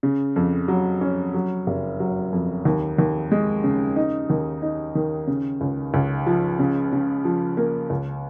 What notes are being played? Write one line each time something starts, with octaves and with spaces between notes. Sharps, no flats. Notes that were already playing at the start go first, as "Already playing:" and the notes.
C#3
F2
F#3
C#4
F#3
F#1
F#3
F2
D#2
D#2
G#3
C#3
D#4
D#2
D#4
D#3
C#3
C#2
C#2
F3
C#3
C#3
F3
A#3
C#2